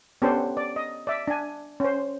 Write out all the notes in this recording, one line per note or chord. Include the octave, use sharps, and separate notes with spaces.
B3 C#4 D4 G4 A4 C5
D5
D#5
D5 E5
D4 G#5
C#4 C5